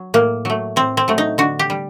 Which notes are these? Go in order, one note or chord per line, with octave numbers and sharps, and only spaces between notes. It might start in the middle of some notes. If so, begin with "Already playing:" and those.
Already playing: F#3
A2 A#3
F#3 A3
A2 C4
C4
F#3 A3
D#4
D3 F#4
G4
G3